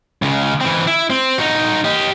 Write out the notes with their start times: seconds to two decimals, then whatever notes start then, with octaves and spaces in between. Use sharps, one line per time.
0.22 C#2 C#3
0.61 E3 C4
0.87 E4
1.10 C4
1.38 D#4 F#4
1.84 G4 D#5